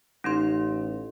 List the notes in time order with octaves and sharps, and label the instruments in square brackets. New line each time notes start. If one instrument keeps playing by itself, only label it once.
[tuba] A1 [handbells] C#4 D#4 C6